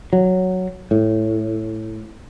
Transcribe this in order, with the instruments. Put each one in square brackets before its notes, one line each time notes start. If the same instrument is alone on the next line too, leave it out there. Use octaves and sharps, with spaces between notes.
[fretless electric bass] F#3
A2